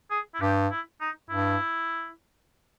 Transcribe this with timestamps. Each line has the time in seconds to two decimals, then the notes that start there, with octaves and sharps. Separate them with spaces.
0.10 G#4
0.34 E4
0.41 G2 G4
0.71 E4
1.01 D#4
1.29 G2 E4